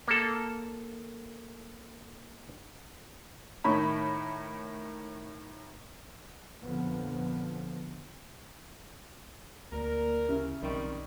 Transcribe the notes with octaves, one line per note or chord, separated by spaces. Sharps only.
A#3 A4
A2 D#3 C#5 B5
F2 A#2 D3 F3 B3
D2 A#3 A#4 D5
C#3 E4 E5
B1 D#3 G3 C4 D5 C#6